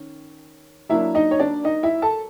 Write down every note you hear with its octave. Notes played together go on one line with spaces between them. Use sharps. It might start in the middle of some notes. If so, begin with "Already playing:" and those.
Already playing: D#3 C#4
F#3 A#3 D4 E4 E5
D#4 D#5
C#5
D4 D5
D#4 D#5
E4 E5
A4 A5